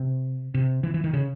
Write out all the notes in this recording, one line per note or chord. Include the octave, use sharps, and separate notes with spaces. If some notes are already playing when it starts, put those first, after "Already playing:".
Already playing: C3
C3
E3
E3
D#3
C#3